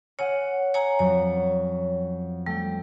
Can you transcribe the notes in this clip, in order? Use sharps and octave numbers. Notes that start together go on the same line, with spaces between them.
C#5 F#5 G#5 F6
C#5 G#5 A#5 G#6
F2 F#3 C#5
C#4
G3 A3 G5